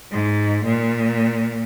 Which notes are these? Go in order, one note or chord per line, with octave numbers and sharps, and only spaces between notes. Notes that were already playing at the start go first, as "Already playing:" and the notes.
G#2
A#2